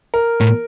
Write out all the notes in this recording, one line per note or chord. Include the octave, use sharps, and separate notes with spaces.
A#4
A2